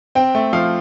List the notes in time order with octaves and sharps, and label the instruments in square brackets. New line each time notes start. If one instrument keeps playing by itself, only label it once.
[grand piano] C4 G5
A3
F3 F5